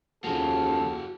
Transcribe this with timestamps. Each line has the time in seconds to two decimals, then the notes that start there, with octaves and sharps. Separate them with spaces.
0.24 D#2 C#3 F3 A#3 F#4 G#4 A4